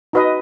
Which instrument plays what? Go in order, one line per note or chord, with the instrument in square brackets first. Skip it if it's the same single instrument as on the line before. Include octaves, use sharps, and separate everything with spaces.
[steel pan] D#4 F#4 B4 D#5